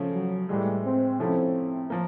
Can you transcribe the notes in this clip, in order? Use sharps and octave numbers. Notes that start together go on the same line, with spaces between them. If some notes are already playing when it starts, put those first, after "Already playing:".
Already playing: C#3 F3 A3 C#4
F#3
A2 E3 G3 G#3
C4
C3 F3 A3 C4 C#4 E4
F3 A#3